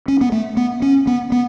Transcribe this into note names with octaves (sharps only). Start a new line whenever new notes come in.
C#4
B3
A3
B3
C#4
B3
B3